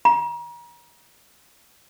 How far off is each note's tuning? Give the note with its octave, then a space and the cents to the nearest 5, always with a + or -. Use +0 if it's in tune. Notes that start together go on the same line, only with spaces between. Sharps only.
A#5 +35